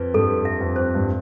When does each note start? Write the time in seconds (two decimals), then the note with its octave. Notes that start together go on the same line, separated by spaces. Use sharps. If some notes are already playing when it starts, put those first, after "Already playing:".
Already playing: F2 B4
0.14 G2 A4
0.45 E5
0.60 F2
0.76 C5
0.95 G2